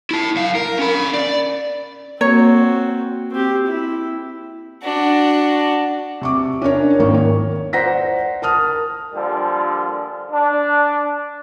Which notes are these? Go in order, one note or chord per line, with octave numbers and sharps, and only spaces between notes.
E4 A5
F#2 F5
A#4
C#4 B5
D5
A#3 C4 F#4 C#5
C4 G4
E4
D4 F#4
C3 C#6 D6
C#4 D4 A#4 C#5
G#1 D#3 A#3 C#6
C#5
C5 D5 F#5 A#5 A#6 B6
A#4 A5 D#6 F6
A#2 D3 F3 G3
D4